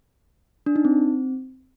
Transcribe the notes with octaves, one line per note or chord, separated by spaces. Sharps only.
D4
D#4
C4